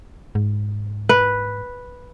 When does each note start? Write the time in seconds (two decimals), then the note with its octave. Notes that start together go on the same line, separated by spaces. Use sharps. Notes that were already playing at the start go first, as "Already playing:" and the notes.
0.35 G#2
1.09 B4